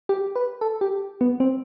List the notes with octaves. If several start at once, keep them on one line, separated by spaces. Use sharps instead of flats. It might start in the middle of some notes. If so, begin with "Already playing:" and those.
G4
B4
A4
G4
B3
C4